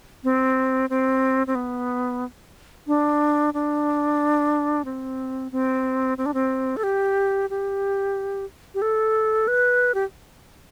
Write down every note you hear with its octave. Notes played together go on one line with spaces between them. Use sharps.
C4
C4
C4
B3
D4
D4
C4
C4
C4
D4
C4
A4
G4
G4
G4
A4
B4
G4